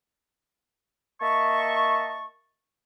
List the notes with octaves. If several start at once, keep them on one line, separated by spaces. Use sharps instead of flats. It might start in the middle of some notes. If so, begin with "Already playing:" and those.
A#3 D#5 E5 A5 C#6